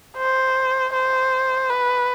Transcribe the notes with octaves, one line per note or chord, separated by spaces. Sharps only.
C5
C5
B4